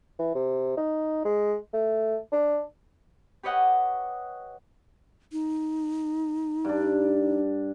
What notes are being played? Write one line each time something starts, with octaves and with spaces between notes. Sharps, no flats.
E3
C3
D#4
G#3
A3
D4
G4 B4 C#5 D#5 F#5
D#4
G2 D4